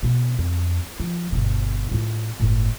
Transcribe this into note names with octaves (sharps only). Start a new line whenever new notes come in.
B2 B3
F2
F3
G1 B2
A2 F4
G1 A2